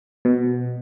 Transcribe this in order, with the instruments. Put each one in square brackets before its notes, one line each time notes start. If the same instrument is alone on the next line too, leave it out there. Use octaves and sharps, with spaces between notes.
[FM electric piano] B2